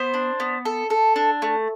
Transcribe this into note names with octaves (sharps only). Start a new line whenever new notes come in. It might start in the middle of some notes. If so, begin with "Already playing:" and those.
Already playing: B3 C5
D4
B3
A4
A4
D4
A3